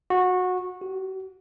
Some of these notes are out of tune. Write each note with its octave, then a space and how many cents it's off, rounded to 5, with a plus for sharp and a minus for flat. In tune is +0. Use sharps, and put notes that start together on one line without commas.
F#4 -20
F#4 +45